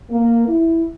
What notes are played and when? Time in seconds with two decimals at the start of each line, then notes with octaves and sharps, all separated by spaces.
0.10 A#3
0.48 E4